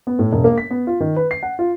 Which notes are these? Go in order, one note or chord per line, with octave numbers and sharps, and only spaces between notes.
B3
A2
E1
A#3
B6
B3
F4
D#3
B4
C7
F#5
F4